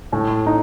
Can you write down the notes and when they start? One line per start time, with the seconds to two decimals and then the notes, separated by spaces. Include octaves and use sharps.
0.12 A2
0.46 D#4